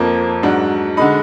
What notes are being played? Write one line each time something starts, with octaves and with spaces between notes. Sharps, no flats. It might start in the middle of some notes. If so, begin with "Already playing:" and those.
Already playing: F2 F3 A#3
G#2 F#3 D4
D3 G#3 D#4 B5